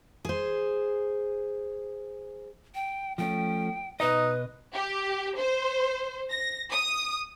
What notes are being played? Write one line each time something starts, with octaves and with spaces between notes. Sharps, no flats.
G#4 C5
G5
F3 A3 C#4 G5
B2 D#4 B4 D#5
G4
C5
A#6
D#6